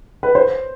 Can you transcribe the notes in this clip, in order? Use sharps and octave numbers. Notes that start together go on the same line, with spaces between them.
B4
C5